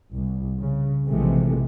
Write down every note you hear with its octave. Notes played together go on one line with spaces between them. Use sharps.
C2
C#3
A#1 C3 E3 F3 G#3 A3